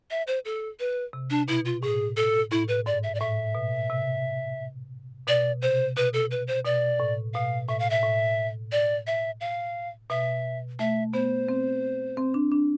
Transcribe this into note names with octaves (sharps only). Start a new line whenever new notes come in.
E5
C5
A4
B4
C3
D4
B2 E4
F4
A2 G#4
A4
A2 E4
B4
G#2 D5
E5
D5
A2 E5
B2
C3
B2 D5
C3 C5
B2 B4
A4
B4
C5
B2 D5
A2
B2 F5
A2 E5
F5
E5
A2
D5
E5
F5
B2 E5
A3 E5
B3 C5
C4
C4
D4
D4